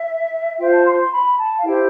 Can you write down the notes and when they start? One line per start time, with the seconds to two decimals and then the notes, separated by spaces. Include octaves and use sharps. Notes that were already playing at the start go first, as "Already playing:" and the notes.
Already playing: E5
0.59 F4 C5 G5
0.72 A5
0.85 C6
0.98 C6
1.12 B5
1.38 A5
1.56 F5
1.64 E4 G4 C5 G5